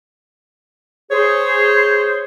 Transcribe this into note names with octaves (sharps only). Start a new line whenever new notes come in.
G#4 C5 C#5